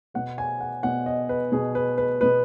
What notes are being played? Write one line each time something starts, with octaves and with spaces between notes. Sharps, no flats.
B2 B3 F#5
G#5
F#5
B2 B3 F#5
D#5
B4
B2 B3 G#4
B4
B4
B2 B3 B4